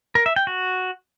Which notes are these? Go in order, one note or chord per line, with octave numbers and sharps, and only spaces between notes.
A#4
E5
G5
F#4